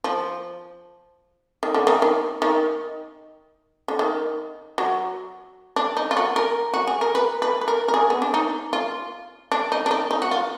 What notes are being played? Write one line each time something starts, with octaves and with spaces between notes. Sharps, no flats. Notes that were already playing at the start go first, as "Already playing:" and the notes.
F3
D#3
D3
D#3
D#3
D#3
D3
D#3
F#3
D4
D#4
F4
F#4
A#4
F#4
G#4
A#4
B4
B4
B4
A#4
A#4
G#4
B3
D4
D#4
F4
D4
D#4
D4
D#4
D#4
F#4
F4